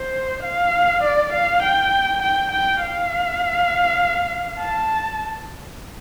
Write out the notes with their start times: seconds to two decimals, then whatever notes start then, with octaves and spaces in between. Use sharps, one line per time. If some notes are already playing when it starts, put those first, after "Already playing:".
Already playing: C5
0.43 F5
1.03 D5
1.33 F5
1.62 G5
2.22 G5
2.52 G5
2.81 F5
4.60 A5